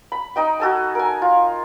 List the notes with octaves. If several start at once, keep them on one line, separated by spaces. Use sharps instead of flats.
B5
D#4 D#5 G5
F#4 A4 G#5
A#4 G#5
F4